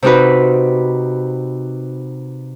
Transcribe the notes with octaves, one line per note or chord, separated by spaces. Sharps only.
C3 C4 D#4 F#4 B4